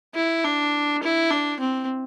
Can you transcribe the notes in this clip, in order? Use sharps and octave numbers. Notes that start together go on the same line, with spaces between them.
E4
D4
E4
D4
C4